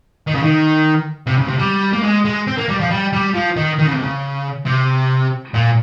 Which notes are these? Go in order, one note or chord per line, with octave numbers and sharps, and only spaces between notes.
D#3
C#3
D#3
C3
C#3
C3
G3
A#3
G#3
G#3
C4
A#3
G3
F3
G3
G3
F3
D#3
D#3
C#3
C3
C#3
C3
A#2